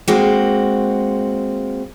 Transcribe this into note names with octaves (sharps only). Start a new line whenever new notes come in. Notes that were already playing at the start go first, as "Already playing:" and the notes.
G#3 A#3 C4 F#4